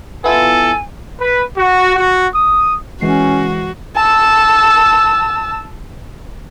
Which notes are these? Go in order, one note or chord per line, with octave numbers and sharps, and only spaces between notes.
B3 E4 F4 A4 G#5
B4
F#4
F#4
D#6
E3 G#3 C#4 F#4 C7
A5 E6